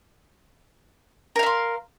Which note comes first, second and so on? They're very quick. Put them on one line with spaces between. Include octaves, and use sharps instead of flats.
A#4 F5 E5 C6